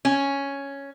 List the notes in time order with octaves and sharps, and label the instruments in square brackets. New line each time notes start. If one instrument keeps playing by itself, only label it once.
[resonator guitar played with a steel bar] C#4